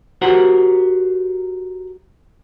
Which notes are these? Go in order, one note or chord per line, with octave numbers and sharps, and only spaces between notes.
F#4 G4 A#4 C5 F#5